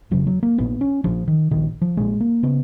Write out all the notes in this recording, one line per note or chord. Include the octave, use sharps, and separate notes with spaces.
F1 F2 C#3 F#3
F#3
A#3
A#1 A#2 B3
C#4
A#1 A#2 F3
D#3
A#1 A#2 D#3
F3
A#1 A#2 G#3
A#3
C#3 B3